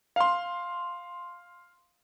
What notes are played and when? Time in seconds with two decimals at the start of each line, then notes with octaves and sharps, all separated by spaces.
0.16 F5 C6